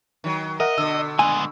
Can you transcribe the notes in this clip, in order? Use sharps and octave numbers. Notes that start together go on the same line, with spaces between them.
D#3 F#3
A#4 D#5 E5 F#5
B2 D3 E6
G#3 B3 G#5